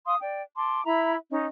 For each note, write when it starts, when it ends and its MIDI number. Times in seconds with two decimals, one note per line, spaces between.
0.06 0.15 77
0.06 0.15 84
0.06 0.15 87
0.20 0.42 74
0.20 0.42 79
0.56 0.82 81
0.56 0.82 84
0.56 0.82 86
0.84 1.15 64
0.84 1.15 76
0.84 1.15 82
0.84 1.15 83
1.30 1.46 61
1.30 1.46 63
1.30 1.46 75